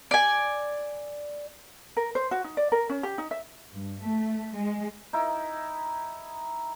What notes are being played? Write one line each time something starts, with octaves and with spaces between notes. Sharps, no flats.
D5 G#5
A#4
C5
F#4
D#4
D5
A#4
C#4
G4
D#4
E5
G2
A3
G#3
D#4 E4